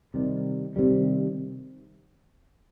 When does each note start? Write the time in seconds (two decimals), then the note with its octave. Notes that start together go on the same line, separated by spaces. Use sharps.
0.14 C3 D#3 G3
0.76 C3 D#3 G3